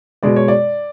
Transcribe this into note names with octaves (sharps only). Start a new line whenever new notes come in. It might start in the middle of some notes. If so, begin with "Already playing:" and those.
B2 G#3 D5
C#5
D5